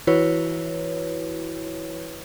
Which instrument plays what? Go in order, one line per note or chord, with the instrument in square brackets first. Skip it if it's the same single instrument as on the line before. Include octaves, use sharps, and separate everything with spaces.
[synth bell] E3 E4 F#4 B4 C#5